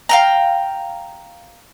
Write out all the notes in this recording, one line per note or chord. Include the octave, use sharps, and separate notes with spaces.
F5 G5 A#5